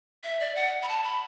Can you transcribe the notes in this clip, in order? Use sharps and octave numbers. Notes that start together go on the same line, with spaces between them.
E5
D5
F#5
B5
A5
B5